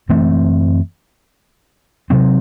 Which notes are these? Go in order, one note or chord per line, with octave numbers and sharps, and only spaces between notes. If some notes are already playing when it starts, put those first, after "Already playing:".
F#2 E3 A3 C4
C3 F#3 C4